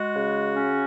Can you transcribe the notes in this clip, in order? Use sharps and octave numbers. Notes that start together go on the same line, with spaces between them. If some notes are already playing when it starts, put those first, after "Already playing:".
Already playing: G#3 F#4
C#3
C#4